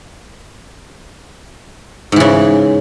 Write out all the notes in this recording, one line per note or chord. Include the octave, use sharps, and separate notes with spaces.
G#2 C#3 E3